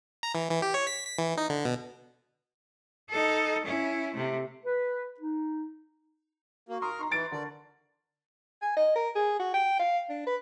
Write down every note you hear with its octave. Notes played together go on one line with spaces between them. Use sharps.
A#5
E3
E3
G4
C#5
B6
B6
E3
D#4
D3
B2
D#4 A4
C#4 E4
C3 A3
B4
D#4
A#3 F#4
A#4 A#5 C6 D#6
D#4 A#5 C6 C#6
E3 D#4 A6 D7
D3 A#4 D5
G#5
D#5
A#4
G#4
F#4
G5
F5
D4
B4